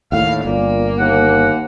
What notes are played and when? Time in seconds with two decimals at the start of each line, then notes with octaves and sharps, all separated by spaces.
0.12 D#2 A2 F5
0.45 G1 A#2 A#3
0.99 D#2 F#5